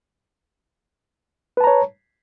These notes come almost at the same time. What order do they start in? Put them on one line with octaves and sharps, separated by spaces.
B4 A5 A#5 C#5